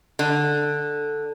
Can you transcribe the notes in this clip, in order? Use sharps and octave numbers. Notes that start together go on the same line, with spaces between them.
D3